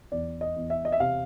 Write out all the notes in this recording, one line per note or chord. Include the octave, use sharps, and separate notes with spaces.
E2 D5
D#5
E2
E5
D#5
E5
C3 F5